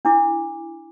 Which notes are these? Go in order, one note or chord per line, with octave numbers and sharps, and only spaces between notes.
D4 E4 D6